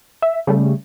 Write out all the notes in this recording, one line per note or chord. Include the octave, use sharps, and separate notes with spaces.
E5
C#3 G3 A3